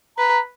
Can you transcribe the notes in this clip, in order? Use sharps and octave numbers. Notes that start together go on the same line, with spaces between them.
B4 A#5